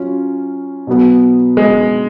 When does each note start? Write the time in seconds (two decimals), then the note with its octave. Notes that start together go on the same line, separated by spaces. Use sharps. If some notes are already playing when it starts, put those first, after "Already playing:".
Already playing: F#3 C#4 F4
0.87 B2 F#3 B3
1.57 G#3